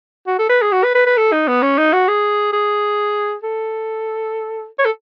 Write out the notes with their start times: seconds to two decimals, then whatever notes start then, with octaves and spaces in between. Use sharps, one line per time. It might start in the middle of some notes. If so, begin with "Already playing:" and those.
0.27 F#4
0.39 A4
0.50 B4
0.62 G#4
0.72 F#4
0.84 B4
0.95 B4
1.06 B4
1.17 A4
1.33 D#4
1.48 B3
1.62 C#4
1.78 D#4
1.93 F#4
2.08 G#4
2.53 G#4
3.43 A4
4.79 C#5
4.85 A4